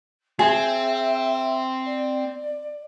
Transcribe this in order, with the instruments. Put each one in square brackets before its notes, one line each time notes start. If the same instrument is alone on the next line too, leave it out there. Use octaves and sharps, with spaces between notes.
[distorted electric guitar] C4 [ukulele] G#4 [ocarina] E5
[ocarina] D5